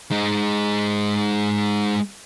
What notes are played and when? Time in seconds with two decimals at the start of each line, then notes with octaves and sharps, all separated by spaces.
0.11 G#3 D#4